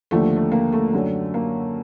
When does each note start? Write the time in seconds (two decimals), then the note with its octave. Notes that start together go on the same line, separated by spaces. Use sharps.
0.11 D#2 D3 F3 A3
0.37 A3
0.52 A#3
0.73 A3
0.93 F#2 D3 F#3
1.34 A#3